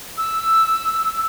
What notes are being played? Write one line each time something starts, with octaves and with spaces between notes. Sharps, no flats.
E6